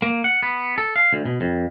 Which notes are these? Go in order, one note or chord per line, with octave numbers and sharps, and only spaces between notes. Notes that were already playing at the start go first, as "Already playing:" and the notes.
A#3
F#5
B3
A4
F5
D2
B2
F2